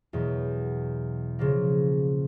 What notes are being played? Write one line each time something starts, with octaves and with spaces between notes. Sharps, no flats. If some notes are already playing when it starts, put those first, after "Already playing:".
E2 B2 F#3
C#3 F3 A#3